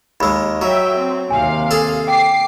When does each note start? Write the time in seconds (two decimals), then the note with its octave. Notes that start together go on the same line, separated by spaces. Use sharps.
0.20 D#2 G#3 B5 E6
0.62 F#3 E5 G5 A#5
0.98 C4
1.30 D#2 C3 F5 G#5
1.71 G#4 A4
2.08 G5 D6 C7